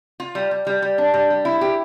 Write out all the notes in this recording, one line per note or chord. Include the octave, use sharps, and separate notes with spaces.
F4
G3
G3
G3
G3
D4
G3
G3
E4
G4